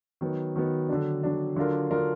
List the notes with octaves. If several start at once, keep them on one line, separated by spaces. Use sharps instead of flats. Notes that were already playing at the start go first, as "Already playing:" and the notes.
D#3 F#3 B3
D#3 F#3 B3
D3 F#3 D4
D3 F#3 D4
D3 F#3 D4 F4 A#4
D3 F#3 D4 F4 A#4